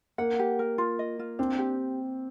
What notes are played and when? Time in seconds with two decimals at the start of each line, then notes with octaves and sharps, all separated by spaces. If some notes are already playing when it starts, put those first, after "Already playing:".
0.18 A#3 F#5
0.39 G4
0.59 A#4
0.78 F4
0.99 D#5
1.19 F4
1.39 C4 D4
1.59 G4